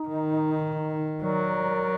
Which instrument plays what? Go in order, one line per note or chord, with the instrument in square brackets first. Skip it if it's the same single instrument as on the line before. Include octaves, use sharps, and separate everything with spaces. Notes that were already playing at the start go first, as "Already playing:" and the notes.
Already playing: [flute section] D#4
[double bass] D#3
[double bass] F#3 [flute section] A#4 D5